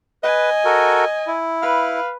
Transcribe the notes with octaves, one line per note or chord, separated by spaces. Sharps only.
B4 D#5 G#5
F#4 A4 A#4
E4
B4 F5